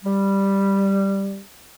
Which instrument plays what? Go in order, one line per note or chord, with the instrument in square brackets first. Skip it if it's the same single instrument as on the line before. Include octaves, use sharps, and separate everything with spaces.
[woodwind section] G3